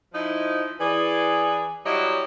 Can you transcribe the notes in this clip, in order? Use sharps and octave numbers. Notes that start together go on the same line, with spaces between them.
F3 D#4 E4
E3 G#4 D5
F#3 G3 E4 G4 C#5 D#5